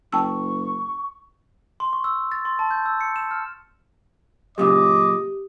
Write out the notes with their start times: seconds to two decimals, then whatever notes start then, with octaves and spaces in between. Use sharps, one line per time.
0.13 F#1 G5 A5 C#6 E6
1.80 C6
1.93 C#6
2.04 E6
2.32 A6
2.45 C6
2.59 A5
2.71 G6
2.86 E6
3.01 C#7
3.16 E7
3.31 F6
4.58 F#2 A#2 C#3 G4 D#5 D6